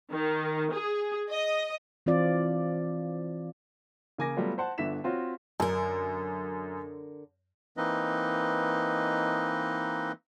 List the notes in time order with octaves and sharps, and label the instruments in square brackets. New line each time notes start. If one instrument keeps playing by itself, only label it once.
[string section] D#3
G#4
D#5
[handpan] E3 C4 F4 D5
[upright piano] C#3 A#3 G#5 D6 A#6
F#3 G3 A3 B3 F4
C5 F#5 A5
G1 D3 E5 B6 E7
C4 F4 F#4 C#5
[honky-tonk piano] F#2 [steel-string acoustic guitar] D3 A#4
[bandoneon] E3 A#3 C4 D#4 B4 D#5